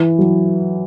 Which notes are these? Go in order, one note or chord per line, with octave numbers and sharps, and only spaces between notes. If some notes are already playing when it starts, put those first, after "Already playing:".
Already playing: E3
F#3